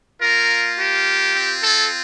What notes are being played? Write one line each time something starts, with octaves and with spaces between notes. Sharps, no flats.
A#3 F4 A#4
G4
C4 F4
A4